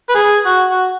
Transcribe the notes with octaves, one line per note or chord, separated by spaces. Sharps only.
B4
G#4
F#4
F#4